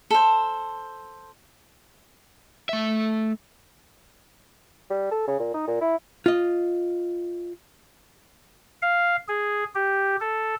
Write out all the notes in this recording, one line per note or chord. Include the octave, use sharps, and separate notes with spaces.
A4 C5
A3 E5
G3
A4
C#3
A#2
D#4
A#2
E4
F4 D#5
F5
G#4
G4
A4